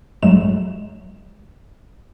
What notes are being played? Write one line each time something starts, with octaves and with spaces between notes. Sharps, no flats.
A#1 G2 F#3 G#3 A3 E7